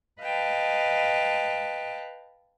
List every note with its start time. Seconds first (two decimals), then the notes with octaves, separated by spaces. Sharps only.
0.20 B4 D#5 F5 G5 A5